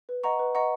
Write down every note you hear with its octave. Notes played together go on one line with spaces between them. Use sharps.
B4
D#5 F#5 A#5 C#6
B4
D#5 F#5 A#5 C#6